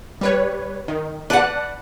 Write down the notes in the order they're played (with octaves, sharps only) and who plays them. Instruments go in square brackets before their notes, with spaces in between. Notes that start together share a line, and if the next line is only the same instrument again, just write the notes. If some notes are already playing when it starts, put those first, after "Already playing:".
[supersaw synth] G3 B4 C#5
D#3
[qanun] B4 F#5 [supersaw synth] D5 A5 F#6